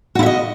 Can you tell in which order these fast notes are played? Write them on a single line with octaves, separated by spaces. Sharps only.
F#4 E4 E5 D#5